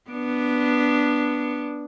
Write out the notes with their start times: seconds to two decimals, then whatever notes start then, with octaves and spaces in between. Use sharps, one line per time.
0.10 B3 D4